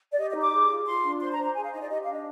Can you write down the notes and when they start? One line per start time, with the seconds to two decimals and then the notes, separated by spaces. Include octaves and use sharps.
0.12 D5
0.19 G4 D#5
0.31 D#5
0.36 D#4
0.41 D6
0.53 G#4
0.70 F4
0.87 F4 C6
1.04 D4
1.21 C5 C6
1.33 A#5
1.38 C5
1.44 A#5
1.55 G#4 G#5
1.64 F5
1.73 D#4 D#5
1.81 D5
1.89 G4 D#5
2.03 D4 F5
2.13 D#5